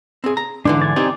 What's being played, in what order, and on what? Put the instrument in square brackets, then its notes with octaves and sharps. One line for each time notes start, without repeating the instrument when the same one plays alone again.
[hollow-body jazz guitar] C4 G#4
A#5
[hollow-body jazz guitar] G#2 D3 E3 [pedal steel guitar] D4
[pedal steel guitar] D5 G#5
[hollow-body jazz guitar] C4 D#4 G4